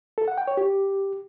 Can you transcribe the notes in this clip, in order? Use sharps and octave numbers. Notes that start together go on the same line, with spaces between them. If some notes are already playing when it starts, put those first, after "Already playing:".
A4
F#5
G5
C#5
G4